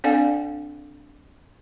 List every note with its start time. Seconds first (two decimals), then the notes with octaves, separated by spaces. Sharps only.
0.04 C4 D4 A4 D5 F5 G#5